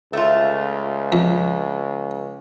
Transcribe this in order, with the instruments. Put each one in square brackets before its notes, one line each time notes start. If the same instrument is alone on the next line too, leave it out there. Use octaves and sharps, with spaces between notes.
[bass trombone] C#2 [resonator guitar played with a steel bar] A3 F4
[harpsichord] F2